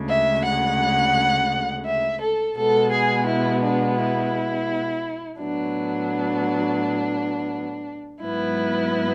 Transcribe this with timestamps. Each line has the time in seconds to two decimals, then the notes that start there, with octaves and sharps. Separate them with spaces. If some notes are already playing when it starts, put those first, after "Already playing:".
Already playing: D2 C#3 G#3
0.09 E5
0.44 F#5
1.86 E5
2.21 A4
2.56 B2 G#3 B3 A4
2.92 G#4
3.27 E4
3.63 D4
3.98 E4
5.39 A2 F#3 B3 D4
8.22 G#2 F#3 B3 E4